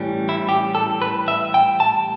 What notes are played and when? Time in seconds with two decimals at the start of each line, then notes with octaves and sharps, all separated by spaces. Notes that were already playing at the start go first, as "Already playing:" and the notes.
Already playing: A2 E3 G3 C#4
0.29 E4
0.49 G4
0.75 A4
1.02 B4
1.28 E5
1.54 G5
1.80 A5